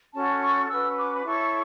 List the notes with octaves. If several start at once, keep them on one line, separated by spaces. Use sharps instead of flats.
C#4 F#4 A4 C#5 A5
C#6
C#4 F#4 B4 E6
D6
B5
E4 A4 C#5 C#6